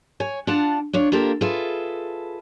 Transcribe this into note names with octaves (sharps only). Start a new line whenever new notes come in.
C#5 G#5
D4 F4 F5 F#5 A5
D4 F4 C#5
A#3 D4 F4 G4 A4 A#4
F4 G#4 A4 B4 E5